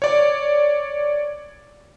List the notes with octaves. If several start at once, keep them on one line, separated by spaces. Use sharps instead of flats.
C#5 D5